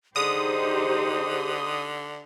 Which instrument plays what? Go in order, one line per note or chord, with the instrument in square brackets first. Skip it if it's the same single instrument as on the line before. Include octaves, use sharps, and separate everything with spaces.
[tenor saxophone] D3 [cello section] D#4 G4 C5 [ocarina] G#4 [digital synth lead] D#6